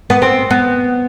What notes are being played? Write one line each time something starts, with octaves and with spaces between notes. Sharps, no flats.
B3
C4
B3